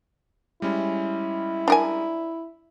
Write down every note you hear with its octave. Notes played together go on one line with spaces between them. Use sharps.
G3 G#3 C#4 E4
D4 A#4 G#5